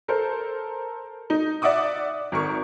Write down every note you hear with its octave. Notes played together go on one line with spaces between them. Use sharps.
A4 A#4 C5
D#4
D5 E5 F#5 D6 D#6
G#1 A#4 C#6